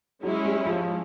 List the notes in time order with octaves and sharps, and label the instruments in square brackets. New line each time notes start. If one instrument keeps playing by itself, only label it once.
[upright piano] F#3 [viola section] G#3 C#4 E4
[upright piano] G3
F3